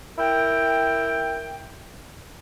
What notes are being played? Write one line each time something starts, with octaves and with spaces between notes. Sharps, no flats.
E4 A#4 G5